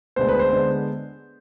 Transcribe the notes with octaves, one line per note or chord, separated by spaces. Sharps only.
D2 D3 G#3 B3 C5
B4
C5
D3 G#3 B3